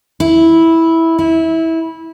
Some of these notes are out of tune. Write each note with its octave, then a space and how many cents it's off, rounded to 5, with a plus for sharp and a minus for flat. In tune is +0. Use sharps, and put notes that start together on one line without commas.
E4 -10
E4 -20